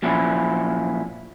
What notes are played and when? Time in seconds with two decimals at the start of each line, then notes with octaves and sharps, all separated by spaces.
0.02 F#2 A#2 F3 C#4 E4